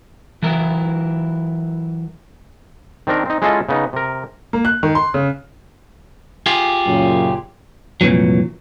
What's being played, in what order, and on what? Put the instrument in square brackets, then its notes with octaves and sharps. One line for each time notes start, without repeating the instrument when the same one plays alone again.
[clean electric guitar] E3 F#3 E4 A#4
[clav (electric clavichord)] D#3 C4 D4 A#4
C4 D#4
G#3 C#4 E4 F4 A4 D#5
C#3 B3 D#4
C3 A#4
[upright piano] A#3
F#6
D#3
C6
C#3
[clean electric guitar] F4 G4 G#4
[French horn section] F#2 A#2 C#3
[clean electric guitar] C2 F2 A#2 E3 F#3